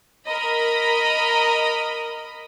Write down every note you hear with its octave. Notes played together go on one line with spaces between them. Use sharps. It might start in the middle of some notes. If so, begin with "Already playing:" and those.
A#4 D#5 B5